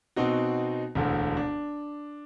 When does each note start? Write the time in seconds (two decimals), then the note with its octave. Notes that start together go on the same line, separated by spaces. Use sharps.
0.16 B2 C4 D#4 F#4
0.95 E1 D2 D3
1.37 D4